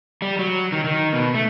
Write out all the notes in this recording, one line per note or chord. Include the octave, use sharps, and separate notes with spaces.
G3
F#3
D#3
D#3
B2
A3